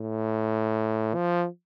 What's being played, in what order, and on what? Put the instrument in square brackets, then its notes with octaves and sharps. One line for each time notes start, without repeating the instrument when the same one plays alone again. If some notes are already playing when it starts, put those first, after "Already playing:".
Already playing: [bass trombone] A2
F3